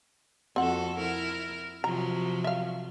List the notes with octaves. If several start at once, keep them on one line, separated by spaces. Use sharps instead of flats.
F2 C4 F#4 A4 F#5
E4 A#4
C3 F3 F#3 A#5
E5 F5